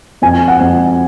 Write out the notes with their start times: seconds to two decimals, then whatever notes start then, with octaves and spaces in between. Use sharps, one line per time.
0.22 F2 G#5
0.48 F#5
0.60 F2